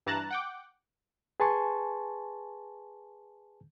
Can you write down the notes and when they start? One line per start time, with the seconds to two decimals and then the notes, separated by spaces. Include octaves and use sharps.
0.06 G2 E3 A5 A#5 F#6 A6
0.31 F#5 G5 D6
1.40 G#4 B4 G#5 A5 C6 C#6